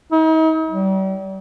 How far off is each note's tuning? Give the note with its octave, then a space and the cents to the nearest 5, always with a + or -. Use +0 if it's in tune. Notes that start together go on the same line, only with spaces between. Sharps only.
D#4 +40
G3 -40